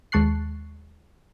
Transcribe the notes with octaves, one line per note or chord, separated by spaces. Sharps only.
D#2 G#3 A5 C#6 F#6 C7